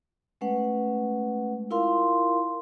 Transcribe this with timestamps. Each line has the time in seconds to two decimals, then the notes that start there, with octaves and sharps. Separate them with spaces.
0.41 G#3 A3 C#4 B4 F#5
1.71 E4 F4 A#4 F5 C6